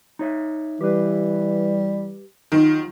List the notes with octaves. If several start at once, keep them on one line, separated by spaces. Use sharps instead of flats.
D#4 C#5 E5
E3 G3 G4 B4
D#2 D#3 F#3 F4